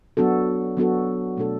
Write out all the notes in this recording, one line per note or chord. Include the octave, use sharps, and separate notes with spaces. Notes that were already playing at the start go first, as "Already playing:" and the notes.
F#3 B3 D4 F#4 A4
F#3 B3 D4 F#4 A4
B2 A3 D4 A4